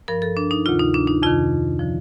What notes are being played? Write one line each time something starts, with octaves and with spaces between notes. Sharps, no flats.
G2 F3 A#4
A4
D4
D#4
D2 C3 D#3 F4
D#4
D4
D#4
F2 C3 D#3 F4
D3 F3